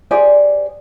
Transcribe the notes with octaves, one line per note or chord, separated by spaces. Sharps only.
G4 G#4 C5 D5